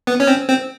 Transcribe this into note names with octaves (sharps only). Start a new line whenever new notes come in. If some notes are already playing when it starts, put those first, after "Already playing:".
B3
C#4
C4
C4